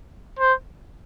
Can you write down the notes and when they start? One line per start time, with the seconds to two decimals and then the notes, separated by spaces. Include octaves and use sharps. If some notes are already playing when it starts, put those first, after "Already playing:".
0.39 C5